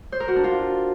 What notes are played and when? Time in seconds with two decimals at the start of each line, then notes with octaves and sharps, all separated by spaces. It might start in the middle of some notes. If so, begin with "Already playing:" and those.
0.12 C5
0.20 A#4
0.28 F#4
0.36 D4
0.44 F4